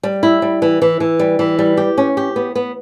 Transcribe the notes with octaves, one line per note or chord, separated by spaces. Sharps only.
G3
E4
G3
E3
E3
E3
G3
E3
G3
G4
C#4
G4
B3
B3